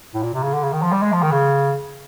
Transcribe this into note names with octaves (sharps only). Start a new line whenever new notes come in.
A2
A#2
C3
C#3
D3
C#3
D#3
F3
G3
G#3
F3
D#3
C#3